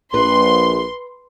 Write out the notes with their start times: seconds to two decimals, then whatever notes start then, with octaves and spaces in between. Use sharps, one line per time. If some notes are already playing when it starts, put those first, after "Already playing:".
0.14 A#1 B4 C6